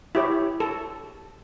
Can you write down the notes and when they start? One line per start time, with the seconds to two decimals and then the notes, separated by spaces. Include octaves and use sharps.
0.15 E4 G4 C#5
0.60 A4